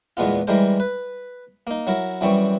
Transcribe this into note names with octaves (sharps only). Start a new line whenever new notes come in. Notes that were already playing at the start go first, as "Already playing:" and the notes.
E2 A#2 G#3 B3 F4
E3 G3 G#3 A#4 C5
B4
A#3 D#4
F#3 E4 A#4
F#2 E3 G3 C4 C#6